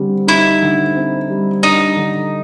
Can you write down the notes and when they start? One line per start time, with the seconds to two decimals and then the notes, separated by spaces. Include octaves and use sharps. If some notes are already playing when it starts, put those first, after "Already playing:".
Already playing: D3 G3 C4
0.27 D#4 E4
0.62 D3
0.96 C4
1.30 G3
1.63 D4 D#4
1.97 D3